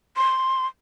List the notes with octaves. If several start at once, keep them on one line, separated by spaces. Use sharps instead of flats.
C6